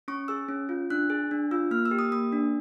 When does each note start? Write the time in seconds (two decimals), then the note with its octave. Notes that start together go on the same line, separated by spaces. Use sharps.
0.08 C#4 C#6
0.28 G#4 E6
0.49 C#4
0.69 F4
0.90 D4 F#6
1.10 G#4
1.31 D4
1.51 F4 E6
1.71 A#3 F6
1.85 E6
1.91 G4
1.99 D#6
2.12 A#3 D#6
2.32 D4